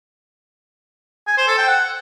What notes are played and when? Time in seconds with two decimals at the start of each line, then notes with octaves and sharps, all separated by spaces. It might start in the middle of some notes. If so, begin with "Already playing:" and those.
1.28 G#5
1.38 C5
1.48 A4
1.58 G5
1.68 F#5